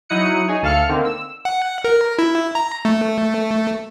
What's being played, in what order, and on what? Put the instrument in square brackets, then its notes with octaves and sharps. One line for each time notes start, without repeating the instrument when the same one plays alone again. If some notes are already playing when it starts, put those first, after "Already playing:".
[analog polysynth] F#3 D#4 E4 D#6 F#6 C#7
D#4 G#4 C#5
D2 A4 F5 F6 C#7
D3 D#3 A#3 C4
E6
[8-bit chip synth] F#5
A#4
E4
A#5
A3